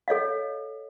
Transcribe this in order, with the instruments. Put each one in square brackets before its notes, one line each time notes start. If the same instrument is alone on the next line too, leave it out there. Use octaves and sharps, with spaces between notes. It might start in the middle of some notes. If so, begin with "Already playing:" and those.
[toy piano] A4 C#5 D#5 F5